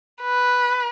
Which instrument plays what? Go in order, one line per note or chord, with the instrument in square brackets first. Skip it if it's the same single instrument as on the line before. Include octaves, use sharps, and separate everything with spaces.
[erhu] B4